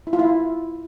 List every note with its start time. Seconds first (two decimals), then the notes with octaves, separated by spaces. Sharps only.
0.07 E4
0.13 F4
0.19 E4